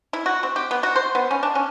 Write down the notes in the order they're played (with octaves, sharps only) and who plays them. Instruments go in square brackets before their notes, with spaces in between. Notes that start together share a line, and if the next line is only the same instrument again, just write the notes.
[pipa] E4
F#4
C4
G4
B3
F#4
C5
B3
C#4
D4
C#4